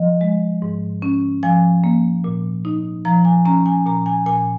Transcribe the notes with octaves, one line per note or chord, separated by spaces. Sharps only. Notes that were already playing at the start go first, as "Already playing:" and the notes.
Already playing: F3 D#5
G#3
G#2
C#4
F3 G#5
A#3
A#2
D#4
F3 A#5
G#5
C#4 A#5
G#5
A#2 A#5
G#5
A#2 G#5